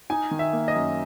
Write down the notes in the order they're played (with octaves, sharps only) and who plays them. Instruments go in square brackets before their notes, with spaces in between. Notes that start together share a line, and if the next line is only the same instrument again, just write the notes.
[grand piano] D#4 G#5
D#3
E5
A#3
D#5
F#2